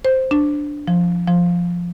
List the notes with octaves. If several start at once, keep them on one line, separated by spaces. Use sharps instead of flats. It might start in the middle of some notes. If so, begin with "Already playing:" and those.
C5
D4
F3
F3